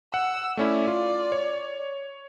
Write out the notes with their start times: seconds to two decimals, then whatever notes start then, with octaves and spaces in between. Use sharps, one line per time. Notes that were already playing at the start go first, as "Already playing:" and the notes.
0.14 F#5 E6
0.57 A3 C#4 E4 D5
0.87 F4
1.32 C#5